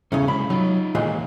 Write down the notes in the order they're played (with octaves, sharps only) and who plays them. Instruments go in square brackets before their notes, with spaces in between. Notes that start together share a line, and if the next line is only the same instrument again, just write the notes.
[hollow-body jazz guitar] E2 G2 C#3 [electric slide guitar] C#4
[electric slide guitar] C3 F#3 G#3 [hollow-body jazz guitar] B5
[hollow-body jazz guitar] F#3 [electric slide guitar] D#4 F4
[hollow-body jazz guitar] D#2 A#2 G#3 [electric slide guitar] E3 A#3